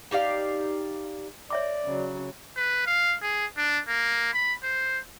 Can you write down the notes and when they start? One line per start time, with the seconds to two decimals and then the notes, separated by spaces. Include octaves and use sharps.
0.11 D#4 G4 D5 F5
1.50 C#5 D5 E5 D6
1.85 C#3 F#3
2.56 B4
2.86 F5
3.22 G#4
3.57 D4
3.88 A#3
4.33 B5
4.63 C5